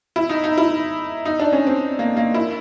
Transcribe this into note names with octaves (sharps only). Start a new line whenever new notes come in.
E4
D#4
D#4
E4
D#4
D4
C#4
C4
A#3
A#3
E4